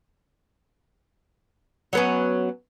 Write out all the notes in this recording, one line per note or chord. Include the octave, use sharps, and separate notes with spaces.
F#3 B3 C#4